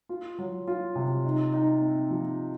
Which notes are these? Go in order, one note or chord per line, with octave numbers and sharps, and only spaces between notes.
F4
F#3
F4
C3
D#4
D#4
C4
F3